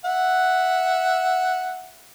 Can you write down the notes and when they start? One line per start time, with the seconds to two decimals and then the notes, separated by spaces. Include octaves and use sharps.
0.05 E5 F#5